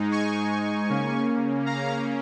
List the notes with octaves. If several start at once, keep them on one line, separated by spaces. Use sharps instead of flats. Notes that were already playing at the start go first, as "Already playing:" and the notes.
Already playing: G#2 G#3 D#4
G#5 C#6
C#3 A#3 C#4
F5 A#5